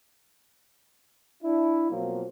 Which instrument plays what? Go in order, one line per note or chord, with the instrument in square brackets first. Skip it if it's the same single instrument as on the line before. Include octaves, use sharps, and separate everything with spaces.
[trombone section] D4 E4
B2 F3 F#3 A#3 C4